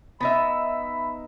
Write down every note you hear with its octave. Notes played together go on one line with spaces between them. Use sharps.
B3 D#4 E5 B5